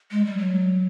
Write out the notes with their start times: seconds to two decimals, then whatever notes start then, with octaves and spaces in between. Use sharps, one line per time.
0.11 G#3
0.25 G3
0.38 F#3